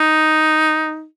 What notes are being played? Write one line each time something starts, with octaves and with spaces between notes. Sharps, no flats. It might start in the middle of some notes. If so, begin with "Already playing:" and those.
Already playing: D#4